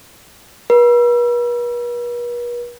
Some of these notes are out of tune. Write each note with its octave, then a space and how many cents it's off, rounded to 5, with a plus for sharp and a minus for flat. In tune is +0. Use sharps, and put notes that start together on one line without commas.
B4 -45